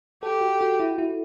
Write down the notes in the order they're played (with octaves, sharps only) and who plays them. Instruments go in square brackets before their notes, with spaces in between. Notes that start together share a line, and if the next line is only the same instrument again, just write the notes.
[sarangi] G4 [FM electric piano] A4
[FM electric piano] F#4
F#4
E4
E4